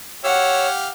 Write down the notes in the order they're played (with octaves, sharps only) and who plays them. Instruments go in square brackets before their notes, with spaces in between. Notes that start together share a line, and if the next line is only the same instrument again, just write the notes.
[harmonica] G4 F5 [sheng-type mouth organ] C#5 E6 [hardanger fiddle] F#5